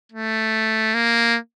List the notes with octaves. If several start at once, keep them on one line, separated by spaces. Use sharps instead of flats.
A3
A#3